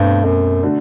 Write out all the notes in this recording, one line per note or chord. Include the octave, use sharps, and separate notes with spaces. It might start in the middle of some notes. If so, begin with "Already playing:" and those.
Already playing: G2 B2 A3 C4
F#2
D3 A3 D4 F#4